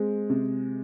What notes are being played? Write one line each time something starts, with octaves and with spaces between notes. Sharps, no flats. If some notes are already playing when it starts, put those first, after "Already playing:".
Already playing: G#3 C4
C3